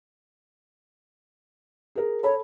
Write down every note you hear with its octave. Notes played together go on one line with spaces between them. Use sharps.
G#4 A#4
A4 C#5 B5